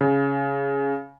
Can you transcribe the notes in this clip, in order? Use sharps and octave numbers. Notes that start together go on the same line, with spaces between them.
C#3